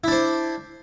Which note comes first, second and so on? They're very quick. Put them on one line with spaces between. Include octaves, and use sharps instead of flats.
E4 D4 C5